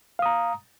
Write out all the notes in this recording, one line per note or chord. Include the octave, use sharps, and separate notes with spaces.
F5 A#5 D#6